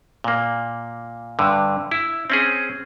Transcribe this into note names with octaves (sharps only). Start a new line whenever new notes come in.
A#2 A#3
G2 D3
E4
C4 C#4 G#4